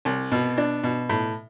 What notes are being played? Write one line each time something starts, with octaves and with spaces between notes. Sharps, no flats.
C2
B2
D4
B2
A2